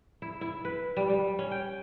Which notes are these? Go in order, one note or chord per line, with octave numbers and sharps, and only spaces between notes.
E4
E4
B4
G3
G3
C#4
G5